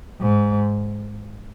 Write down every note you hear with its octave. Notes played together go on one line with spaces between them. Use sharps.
G#2